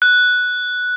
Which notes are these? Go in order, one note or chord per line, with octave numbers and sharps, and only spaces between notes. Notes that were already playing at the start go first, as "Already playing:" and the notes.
F#6